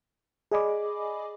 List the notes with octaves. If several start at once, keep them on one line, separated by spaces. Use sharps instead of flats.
G#4 D5 D#5 G#5 B5 D6